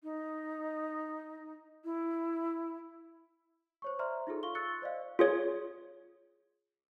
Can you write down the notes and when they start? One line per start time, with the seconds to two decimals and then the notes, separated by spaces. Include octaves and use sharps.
0.03 D#4
1.84 E4
3.82 C5 C#5 C#6
3.99 C5 D5 E5 A#5 C6 F6
4.27 D#4 F4 G#4 A4
4.43 F4 F5 C6 C#6 G7
4.55 C#6 E6 F#6 A6 C#7
4.82 C5 D5 D#5 F5
5.19 F4 G#4 C#5